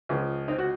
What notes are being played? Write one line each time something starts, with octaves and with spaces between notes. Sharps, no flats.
C#2 C#3 F3
C4 D#4
F#4